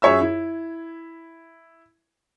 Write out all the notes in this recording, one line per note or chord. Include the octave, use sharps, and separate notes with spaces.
F#2 G#4 C#5 E5 E6
E4